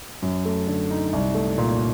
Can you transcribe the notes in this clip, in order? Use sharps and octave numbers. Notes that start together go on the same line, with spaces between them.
F#2
A3
D3
D#4
C2
A3
A#2